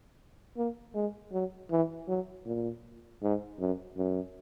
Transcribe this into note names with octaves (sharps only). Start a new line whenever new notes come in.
A#3
G#3
F#3
E3
F#3
A#2
G#2
F#2
F#2